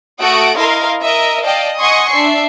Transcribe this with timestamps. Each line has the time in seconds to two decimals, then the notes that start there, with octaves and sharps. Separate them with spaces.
0.20 A3 F#4 F#5 D#6 D7
0.57 E4 A#4 D#5 F5 C6
1.01 A#4 D#5 E5
1.44 D5 D#5 F5 G5 A5
1.78 D#5 F#5 G#5 C6 C#6 D#6
2.11 D4 E5 C7